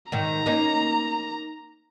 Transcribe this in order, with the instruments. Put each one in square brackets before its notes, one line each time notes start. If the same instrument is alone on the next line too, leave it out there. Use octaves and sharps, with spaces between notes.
[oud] G#2 D#3 [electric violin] A#5
[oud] A#3 C#4 D#4